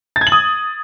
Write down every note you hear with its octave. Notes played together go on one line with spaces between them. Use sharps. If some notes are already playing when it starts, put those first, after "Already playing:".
A6
G#6
F#7
D#6